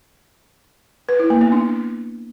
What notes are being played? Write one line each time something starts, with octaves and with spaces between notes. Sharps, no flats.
B4
E4
A#3
B3
D4